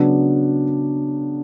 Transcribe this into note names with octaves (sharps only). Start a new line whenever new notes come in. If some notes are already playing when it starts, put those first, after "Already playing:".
Already playing: C#3 F#3 B3 D4